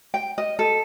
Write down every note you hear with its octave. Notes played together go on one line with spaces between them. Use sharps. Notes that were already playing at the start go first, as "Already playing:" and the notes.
G5
D#5
A4